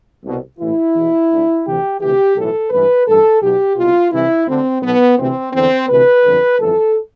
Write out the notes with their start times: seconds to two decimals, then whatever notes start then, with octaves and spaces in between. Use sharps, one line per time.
0.24 C2 B2
0.59 A1 A2 E3 E4
0.95 E2 B2
1.30 D2 D3
1.65 D2 C3 E3 G4
2.00 D2 C3 E3 G4
2.35 B1 A2 E3 A4
2.70 A1 G2 E3 B4
3.06 A1 G2 E3 A4
3.41 B1 B2 G4
3.76 C2 B2 F4
4.12 C2 C3 E3 E4
4.47 D2 D3 C4
4.82 B1 B2 B3
5.17 D2 C3 E3 C4
5.53 E2 D3 C4
5.89 D2 C3 E3 B4
6.24 G1 F2 D3
6.58 G1 F2 E3 A4